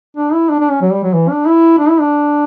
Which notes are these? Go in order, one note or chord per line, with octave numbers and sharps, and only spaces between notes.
D4
E4
D4
D4
C#4
F#3
G3
F#3
E3
D4
E4
D4
E4
D4